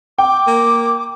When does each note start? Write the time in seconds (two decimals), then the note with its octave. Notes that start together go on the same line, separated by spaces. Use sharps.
0.18 G5 D6
0.47 A#3